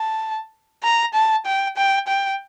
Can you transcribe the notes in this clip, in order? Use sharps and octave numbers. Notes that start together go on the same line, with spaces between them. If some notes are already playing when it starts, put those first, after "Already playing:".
Already playing: A5
A#5
A5
G5
G5
G5